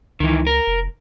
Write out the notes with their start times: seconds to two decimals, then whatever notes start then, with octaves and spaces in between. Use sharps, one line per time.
0.20 C#2 D#3 E3
0.47 A#4
0.67 F1